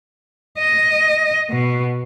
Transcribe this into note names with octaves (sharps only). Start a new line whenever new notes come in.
D#5
B2